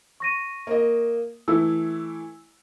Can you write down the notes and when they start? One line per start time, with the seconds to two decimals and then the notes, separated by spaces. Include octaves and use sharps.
0.20 C#6 A#6 D#7
0.67 A#3 D#5
1.48 E3 A3 E4 E6